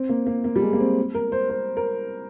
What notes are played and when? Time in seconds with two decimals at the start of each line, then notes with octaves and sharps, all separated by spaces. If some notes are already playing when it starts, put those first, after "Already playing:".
Already playing: C4
0.09 A#3
0.26 A#3
0.44 A#3
0.56 G3
0.62 G#3
0.73 A#3
0.80 C4
1.15 A#4
1.32 C5
1.50 C5
1.77 A#4